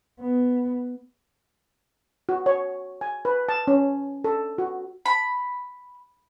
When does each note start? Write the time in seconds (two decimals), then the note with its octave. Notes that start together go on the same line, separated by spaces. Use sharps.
0.20 B3
2.29 F#4
2.46 C#5
3.01 G#5
3.25 B4
3.49 A5
3.67 C#4
4.24 A4
4.58 F#4
5.06 B5